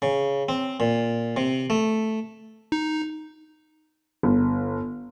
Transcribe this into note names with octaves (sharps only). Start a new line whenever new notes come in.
C#3
C4
A#2
C3
A3
D#4
G1